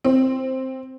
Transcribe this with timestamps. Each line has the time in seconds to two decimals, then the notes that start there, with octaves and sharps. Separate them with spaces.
0.04 C4